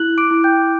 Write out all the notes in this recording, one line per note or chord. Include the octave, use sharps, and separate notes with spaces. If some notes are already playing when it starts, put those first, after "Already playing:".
Already playing: E4 F#6 F#7
D6 D7
E4
G5 G6